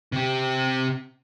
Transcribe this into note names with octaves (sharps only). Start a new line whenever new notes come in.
C3 G4